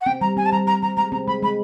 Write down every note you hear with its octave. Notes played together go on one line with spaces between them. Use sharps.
F#5
C4 G5
G3 A#5
C4 G#5
A5
G3 A#5
G3 A#5
G3 A#5
G#3 A#5
C4 A#5
G#3 B5
G#3 B5